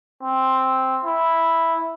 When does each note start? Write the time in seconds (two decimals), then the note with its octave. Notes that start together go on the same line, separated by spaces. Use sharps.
0.23 C4
1.05 E4